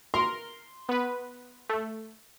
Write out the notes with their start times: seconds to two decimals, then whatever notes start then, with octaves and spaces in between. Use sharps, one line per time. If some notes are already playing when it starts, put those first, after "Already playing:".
0.14 A#4 C6
0.89 B3 B4
1.70 A3